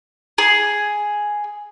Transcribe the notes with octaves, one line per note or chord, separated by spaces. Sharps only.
G#4